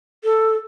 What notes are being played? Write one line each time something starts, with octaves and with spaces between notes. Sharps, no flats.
A4